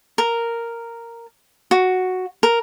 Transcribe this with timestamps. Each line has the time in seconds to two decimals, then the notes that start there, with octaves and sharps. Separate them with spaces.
0.18 A#4
1.71 F#4
2.43 A#4